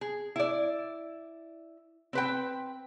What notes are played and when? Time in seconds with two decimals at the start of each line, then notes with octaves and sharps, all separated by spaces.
0.01 G#4
0.36 E4 D5
2.13 C4 B4 G5